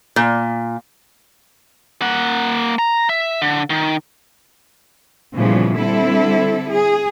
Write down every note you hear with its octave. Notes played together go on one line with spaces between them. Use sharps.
A#2
A#3 F#5
A#5
E5
D3
D#3
A#2 C#3 E3 F3 G3 B3
D3 G3 C4 E4 A4
G#4